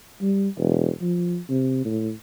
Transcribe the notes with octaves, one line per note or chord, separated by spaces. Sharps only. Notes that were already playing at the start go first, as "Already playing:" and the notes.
G3
E1
F3
C3
A2